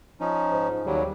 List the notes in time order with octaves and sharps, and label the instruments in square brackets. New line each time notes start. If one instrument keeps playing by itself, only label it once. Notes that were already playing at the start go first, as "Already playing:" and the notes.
[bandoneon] F3 C#4 D#4
[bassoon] G#2
[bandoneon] D#2 F#3 G3 [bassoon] C#3